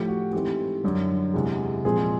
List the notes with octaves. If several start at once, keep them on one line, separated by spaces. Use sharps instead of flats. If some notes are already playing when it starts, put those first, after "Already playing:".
Already playing: A2 F3 A3 G4
F#4
G#2 E3 A3 C4 G4
F#2 D3 G3
E2 C3 E3 G#3
A#2 F3 G#3 C4 G#4